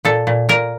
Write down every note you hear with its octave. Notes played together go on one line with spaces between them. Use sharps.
A#2 A4
A#2
A#2 A#4